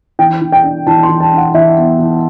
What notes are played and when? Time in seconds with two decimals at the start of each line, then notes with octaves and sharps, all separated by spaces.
0.19 E3 G5
0.41 E3
0.52 G5
0.64 D4
0.87 E3 A5
1.03 C6
1.09 E3
1.20 A5
1.32 D4
1.38 F#5
1.54 E3 E5
1.77 B3
1.99 E3